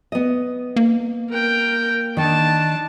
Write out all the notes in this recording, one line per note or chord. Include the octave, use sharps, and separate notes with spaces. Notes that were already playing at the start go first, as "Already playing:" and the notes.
B3 D#5
A#3
A#4 G5
D#3 D4 D#4 A5